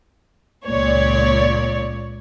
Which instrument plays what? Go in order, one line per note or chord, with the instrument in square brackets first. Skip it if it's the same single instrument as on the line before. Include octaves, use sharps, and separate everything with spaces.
[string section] C#2 A#2 C#5 D5